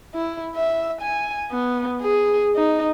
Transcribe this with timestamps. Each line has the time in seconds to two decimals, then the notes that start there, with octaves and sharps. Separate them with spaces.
0.15 E4
0.56 E5
1.02 G#5
1.52 B3
2.02 G#4
2.56 D#4